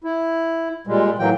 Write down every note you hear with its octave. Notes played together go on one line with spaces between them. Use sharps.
E4
A#2 G3 G#3
A2 E3 F#3 A#3 G5